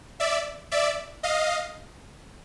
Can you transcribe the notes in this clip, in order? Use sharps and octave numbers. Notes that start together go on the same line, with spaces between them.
D5 E5
D5 E5
D#5 F5